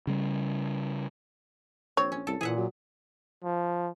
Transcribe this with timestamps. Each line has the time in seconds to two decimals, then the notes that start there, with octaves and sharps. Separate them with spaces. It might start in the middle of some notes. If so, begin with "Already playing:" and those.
0.07 C#3 G3
1.97 A#1 C4 C#5
2.12 C#4
2.27 C2 A4
2.41 A#2 E3 G#4 E5 F#5
2.57 F#3
3.44 F3